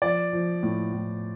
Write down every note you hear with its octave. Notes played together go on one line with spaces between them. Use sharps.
F3 D5
F3
A2
A2